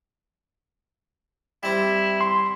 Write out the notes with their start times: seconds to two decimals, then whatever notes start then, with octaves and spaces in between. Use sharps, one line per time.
1.63 G3 C4 E4
2.21 C6